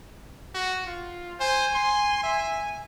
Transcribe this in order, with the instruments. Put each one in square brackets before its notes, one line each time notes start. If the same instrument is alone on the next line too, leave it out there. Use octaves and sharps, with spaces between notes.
[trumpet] F#4
F4
[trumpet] C5 [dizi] G#5
[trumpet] C6
E5